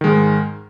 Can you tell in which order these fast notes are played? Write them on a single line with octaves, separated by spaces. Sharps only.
D#3 G#3 G#2